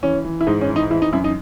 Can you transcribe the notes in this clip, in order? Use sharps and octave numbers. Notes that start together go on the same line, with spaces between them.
E3 C#4
E3
E4
G#2 D#4
C#4
E3
D#4
E3 E4
D#4
F#2 E4
D#4